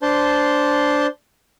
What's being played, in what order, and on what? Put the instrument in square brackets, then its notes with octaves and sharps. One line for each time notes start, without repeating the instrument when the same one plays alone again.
[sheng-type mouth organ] D4 C5 A5 C6